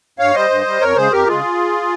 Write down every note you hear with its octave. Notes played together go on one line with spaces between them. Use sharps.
G2 C#5 F5
G3 C5 D#5
G2
G3
F2 A#4 C#5
C#3 G#3 G#4 C5
F2 G4 A#4
C#3 G#3 F4 G#4